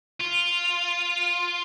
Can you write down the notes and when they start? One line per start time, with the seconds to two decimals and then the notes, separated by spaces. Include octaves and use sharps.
0.21 F4